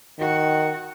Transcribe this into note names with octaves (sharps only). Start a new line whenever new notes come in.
D#3 F#4 F#5